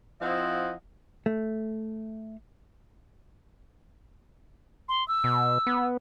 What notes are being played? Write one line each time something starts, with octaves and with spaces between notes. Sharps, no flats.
F3 C4 E4 D#5 F5 F#5
A3
C6
E6
B2
B3